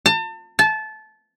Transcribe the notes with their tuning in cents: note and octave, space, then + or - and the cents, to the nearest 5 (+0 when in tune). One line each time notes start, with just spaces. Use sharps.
A5 +35
A5 -20